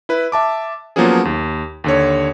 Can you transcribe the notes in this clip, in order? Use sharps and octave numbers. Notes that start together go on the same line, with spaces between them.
E4 B4
E5 A5 D6
F3 F#3 A#3 B3 C#4 G#4
D#2
D#2 D3 C#5